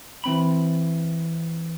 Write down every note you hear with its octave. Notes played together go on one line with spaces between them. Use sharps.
E3 C4 B5